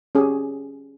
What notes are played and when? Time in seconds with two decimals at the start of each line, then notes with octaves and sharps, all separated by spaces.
0.15 C#4 G4 G#4